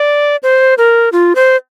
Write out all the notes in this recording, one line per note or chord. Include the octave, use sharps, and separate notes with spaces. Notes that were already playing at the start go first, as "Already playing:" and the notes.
Already playing: D5
C5
A#4
F4
C5